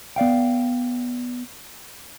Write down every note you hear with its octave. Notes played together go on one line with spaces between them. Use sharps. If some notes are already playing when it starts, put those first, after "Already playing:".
B3 D5 F5 G5